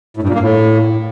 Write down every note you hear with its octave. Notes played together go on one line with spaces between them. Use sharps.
A2
G2
A#2
A#3
A2